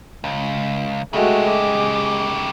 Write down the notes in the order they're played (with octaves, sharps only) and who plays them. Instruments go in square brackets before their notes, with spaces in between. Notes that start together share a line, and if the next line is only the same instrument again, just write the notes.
[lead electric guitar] C#2
[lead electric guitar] C#3 G4 [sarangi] G#3 [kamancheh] A3 F#4
[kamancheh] D6